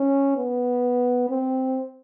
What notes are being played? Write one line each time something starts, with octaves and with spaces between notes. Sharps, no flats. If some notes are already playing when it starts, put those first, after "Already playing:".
Already playing: C#4
B3
C4